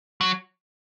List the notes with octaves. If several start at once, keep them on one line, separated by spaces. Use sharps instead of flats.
F#3